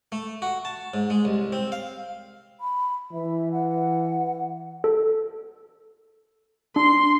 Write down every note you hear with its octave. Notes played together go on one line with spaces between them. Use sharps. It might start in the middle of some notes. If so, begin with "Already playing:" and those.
A3
F#4
A5
G#2
G#3
C2
C4
F5
B5
E3 E5
F#5
A4
D4 C6